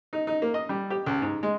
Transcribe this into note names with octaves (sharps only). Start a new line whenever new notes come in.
D#4
D#4
A#3
D#5
G3
G4
C#2
G#2
G#3